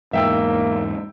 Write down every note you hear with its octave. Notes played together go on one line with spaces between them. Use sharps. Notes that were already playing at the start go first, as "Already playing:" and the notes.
E2 G#2 A#3 E5 G5 E6